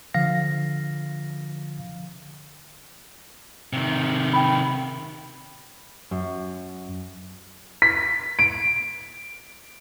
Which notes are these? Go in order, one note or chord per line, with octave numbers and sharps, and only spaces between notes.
D3 F3 F5 A#6
C3 D#3
G5 B5
F#2
B6
D7